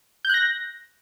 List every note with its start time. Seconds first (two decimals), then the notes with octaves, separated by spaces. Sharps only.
0.25 G6
0.29 F#6
0.34 A#6